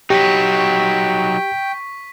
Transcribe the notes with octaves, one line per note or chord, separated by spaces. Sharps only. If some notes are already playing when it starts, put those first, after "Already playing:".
F#3 D#4 G4 G5 C#6 B6